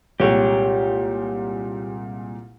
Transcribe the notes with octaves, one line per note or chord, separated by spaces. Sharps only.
C2 A#2 G#3 G4 C#5